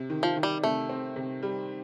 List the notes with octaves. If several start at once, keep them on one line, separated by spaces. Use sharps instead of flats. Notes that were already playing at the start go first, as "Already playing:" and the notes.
Already playing: C3
D#3
F3
D#3
G3
C3 A3
C4
C3
G3